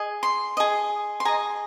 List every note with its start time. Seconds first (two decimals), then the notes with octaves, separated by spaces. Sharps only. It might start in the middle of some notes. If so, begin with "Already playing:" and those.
Already playing: G#4 D#5
0.23 C6
0.57 G#4 D#5
1.20 C6
1.25 G#4 D#5 A#5